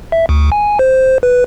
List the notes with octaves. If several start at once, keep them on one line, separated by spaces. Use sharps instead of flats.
E5
D2
G#5
C5
B4